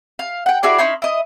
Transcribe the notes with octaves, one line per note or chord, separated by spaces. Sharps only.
F5
F#5 G5
E4 F#4 G#4 D5
C#4 D#4 E4 C6
E4 D#5